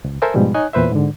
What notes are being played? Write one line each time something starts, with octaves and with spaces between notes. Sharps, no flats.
C#2
A4 A#4 C5 E5 G#5 E6
G#2 B2 F3 G3 G#3
D#4 C#5 D#5 G#5 F#6
E2 A#2 B4 C5 E5
G#2 D3